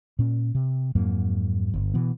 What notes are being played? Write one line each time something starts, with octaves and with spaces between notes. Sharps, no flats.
A#2 C#4
C3
F2 G#2 F#3 A#3
G1
B2 E3 B3